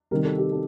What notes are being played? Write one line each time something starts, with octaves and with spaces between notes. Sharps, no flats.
C3 D#3 G3 C4 A#4
A4
G4
A4